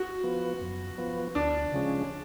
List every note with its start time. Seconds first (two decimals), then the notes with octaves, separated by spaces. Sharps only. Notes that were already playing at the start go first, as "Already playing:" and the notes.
Already playing: F#4
0.24 F3 B3
0.61 F#2
0.98 F3 B3
1.35 D2 D4
1.72 C#3 F3 G#3 C#4